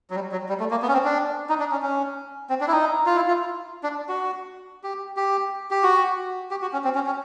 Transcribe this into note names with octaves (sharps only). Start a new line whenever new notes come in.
F#3
G3
F#3
G3
A3
A#3
B3
C#4
C4
D4
D#4
D4
C#4
C#4
C4
D4
E4
D#4
F4
E4
F4
D4
F#4
G4
G4
G4
F#4
G4
F#4
C#4
C4
C#4
C#4